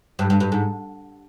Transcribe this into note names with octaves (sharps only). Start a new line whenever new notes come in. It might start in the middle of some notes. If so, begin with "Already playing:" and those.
G2
G2
G2
G#2